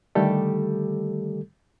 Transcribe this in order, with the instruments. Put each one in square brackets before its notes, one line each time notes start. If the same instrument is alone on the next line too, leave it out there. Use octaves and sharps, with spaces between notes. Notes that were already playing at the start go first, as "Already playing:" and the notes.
[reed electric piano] D3 D#3 G3 A3 G4 A4